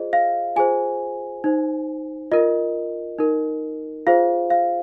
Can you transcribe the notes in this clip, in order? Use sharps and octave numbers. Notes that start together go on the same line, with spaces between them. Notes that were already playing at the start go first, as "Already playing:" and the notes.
Already playing: F4 G#4 C5 D#5
F5
F4 G#4 C5 G#5
D#4 C5
F4 A#4 D#5
D#4 A#4
F4 G#4 C5 F5
F5